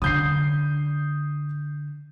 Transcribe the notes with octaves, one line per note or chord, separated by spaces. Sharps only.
D3 D#6 G6 C7